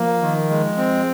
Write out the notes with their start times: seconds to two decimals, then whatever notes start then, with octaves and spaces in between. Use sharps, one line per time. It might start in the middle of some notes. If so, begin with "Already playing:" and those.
Already playing: F3 A#3
0.21 D#3
0.50 G#3
0.77 C4